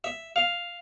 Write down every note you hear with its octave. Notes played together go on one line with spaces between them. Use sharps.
E5
F5